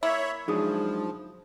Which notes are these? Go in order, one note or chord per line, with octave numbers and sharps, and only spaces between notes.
A#3 E4 C#5 E5
F3 F#3 G#3 D4 D#4 G#4 D#6